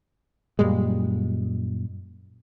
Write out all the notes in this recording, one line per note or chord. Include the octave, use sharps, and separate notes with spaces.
F#2 A#2 G3 G#3